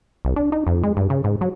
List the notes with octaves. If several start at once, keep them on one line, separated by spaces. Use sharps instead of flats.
C2
D4
D#4
F2
G#3
G2
C#3
G#2
F#3